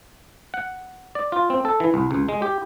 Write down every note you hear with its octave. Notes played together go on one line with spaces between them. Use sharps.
F#5
D5
F4
C4
A4
E3
C2
C#2
G#3
G4